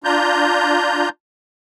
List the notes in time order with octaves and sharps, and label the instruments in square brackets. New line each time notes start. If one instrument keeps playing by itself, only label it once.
[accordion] D4 F4 A#5 G6